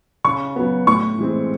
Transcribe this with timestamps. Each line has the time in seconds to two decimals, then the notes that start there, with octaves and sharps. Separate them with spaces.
0.24 C#3 C#6
0.56 F#3 B3
0.87 A2 C#6
1.18 E3 G#3 C4